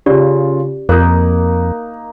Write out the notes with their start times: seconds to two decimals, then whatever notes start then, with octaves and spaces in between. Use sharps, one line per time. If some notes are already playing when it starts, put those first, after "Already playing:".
0.06 C#3 C#4 F4 G4 D5
0.89 F2 A#3 D#4 A#4 F#6